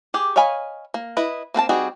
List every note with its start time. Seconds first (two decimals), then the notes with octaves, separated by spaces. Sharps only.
0.14 G4 G#4
0.36 C#5 D#5 F5 G#5 B5
0.94 A#3
1.17 E4 B4 D#5
1.54 A#3 C4 B4 A5
1.69 G3 C4 D#4 F#4 G#4